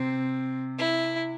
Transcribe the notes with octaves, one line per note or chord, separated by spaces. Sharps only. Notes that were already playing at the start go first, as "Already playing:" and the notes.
Already playing: C3 C4
E4